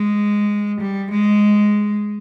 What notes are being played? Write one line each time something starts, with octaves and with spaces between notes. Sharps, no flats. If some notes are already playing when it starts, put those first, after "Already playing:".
Already playing: G#3
G3
G#3